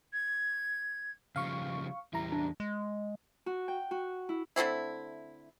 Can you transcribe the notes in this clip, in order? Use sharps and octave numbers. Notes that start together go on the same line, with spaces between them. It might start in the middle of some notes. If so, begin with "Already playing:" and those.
G#6
C#3 F3 G3 F5 C#6
E2 G3 E4 A#5
D4
G#3
F#4
G5
F#4
E4
D3 A3 C4 E4